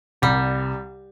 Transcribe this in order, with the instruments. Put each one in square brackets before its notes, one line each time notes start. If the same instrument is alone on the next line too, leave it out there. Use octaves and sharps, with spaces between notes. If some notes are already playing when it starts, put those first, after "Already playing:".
[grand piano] C2 [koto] G3